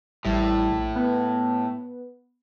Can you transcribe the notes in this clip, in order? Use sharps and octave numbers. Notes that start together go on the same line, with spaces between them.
A1 A2 G3 E4
A#1
B3